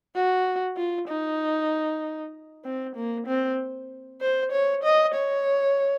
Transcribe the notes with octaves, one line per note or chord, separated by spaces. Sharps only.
F#4
F4
D#4
C4
A#3
C4
C5
C#5
D#5
C#5